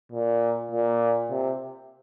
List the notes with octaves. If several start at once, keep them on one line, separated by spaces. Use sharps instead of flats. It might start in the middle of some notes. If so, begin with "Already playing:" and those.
A#2
A#2
C3